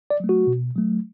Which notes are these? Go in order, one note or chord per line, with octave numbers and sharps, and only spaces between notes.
D5
F#3 A3
F#4
B2
F#3 A3